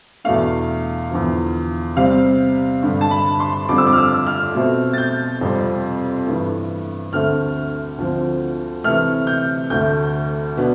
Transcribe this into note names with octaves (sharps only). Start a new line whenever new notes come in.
E2 B2 A3 D4 F5
E2 D3 F3
C3 G3 C4 F5
G2 D3 G3
A5
B5
C6
F2 D3 G3 C4 D6
E6
D6
F6
E6
F6
B2 A3 C4
A6
G6
F2 C3 G3 C4
G2 E3 A3
D2 D3 A3 C4 F6
D2 D3 F3 C4
C3 E3 A3 F6
G6
D2 D3 A3 G6
B2 B3 D4